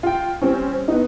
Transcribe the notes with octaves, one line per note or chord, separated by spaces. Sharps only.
F4 G5
G3 C4 C#4
B3 D#4